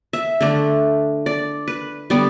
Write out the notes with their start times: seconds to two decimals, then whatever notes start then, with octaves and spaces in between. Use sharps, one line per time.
0.13 E5
0.41 D3 A3 D4
1.26 D5
1.68 B4
2.10 D3 G3 B3 D5